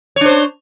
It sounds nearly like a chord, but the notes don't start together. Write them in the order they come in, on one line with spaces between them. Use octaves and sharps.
C#5 D4 C5